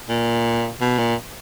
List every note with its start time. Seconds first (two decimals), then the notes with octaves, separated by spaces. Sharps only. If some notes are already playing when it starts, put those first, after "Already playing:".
0.09 A#2
0.81 B2
0.99 A#2